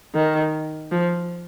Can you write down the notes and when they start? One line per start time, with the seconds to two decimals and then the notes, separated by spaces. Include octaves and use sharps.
0.15 D#3
0.92 F3